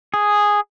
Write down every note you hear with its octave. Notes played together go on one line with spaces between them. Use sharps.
G#4